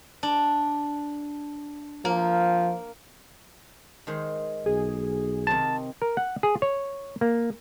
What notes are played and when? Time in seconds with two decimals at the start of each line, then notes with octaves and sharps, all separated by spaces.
0.23 D4
2.05 F3 A#3
4.07 D#3 G#3 C5
4.66 B1 G#4
5.47 C3 D#3 C4 A5
6.02 A#4
6.17 F#5
6.43 G#4
6.62 C#5
7.21 A#3